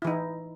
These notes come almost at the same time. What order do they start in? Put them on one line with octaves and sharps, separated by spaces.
E4 E3 D#4